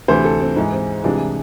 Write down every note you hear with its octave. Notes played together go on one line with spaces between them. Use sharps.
D2 C3 E3 C5
A4
C4
G#2 E3 G#3
C4
C2 C3 E3 G#3 D4